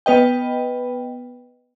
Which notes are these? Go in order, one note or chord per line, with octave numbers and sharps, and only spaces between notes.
B3 B4 D#5 G5